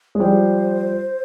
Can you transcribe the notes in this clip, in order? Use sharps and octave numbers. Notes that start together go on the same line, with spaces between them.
G#3
F3 G3 C5